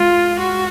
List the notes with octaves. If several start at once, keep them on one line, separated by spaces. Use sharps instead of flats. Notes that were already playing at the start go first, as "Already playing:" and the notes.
Already playing: G#3 F4
F#4